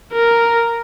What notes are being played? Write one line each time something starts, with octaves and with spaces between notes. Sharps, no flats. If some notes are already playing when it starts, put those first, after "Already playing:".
A#4